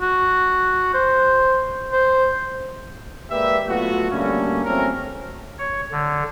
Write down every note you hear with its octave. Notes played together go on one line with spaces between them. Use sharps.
F#4
C5
C5
G#3 A#3 G4 B4 D5 E5
F#3 A3 B3 F4 F#4
D3 G3 A3 A#3 C#4
E2 F#3 A3 C4 C#4 A#4
C#5
D3